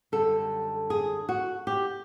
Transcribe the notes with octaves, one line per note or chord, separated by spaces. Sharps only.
F#2 D3 G3 A4
G#4
F#4
G4